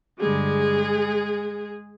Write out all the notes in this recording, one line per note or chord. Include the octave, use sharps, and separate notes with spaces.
G2 D3 G3 G#3 G#4